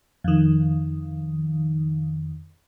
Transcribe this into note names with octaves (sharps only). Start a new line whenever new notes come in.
F2 D#3